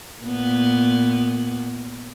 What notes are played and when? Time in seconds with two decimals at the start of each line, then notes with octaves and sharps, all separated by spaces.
0.23 A#2 B3